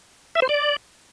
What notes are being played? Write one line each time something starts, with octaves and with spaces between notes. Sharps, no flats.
E5
C5
D5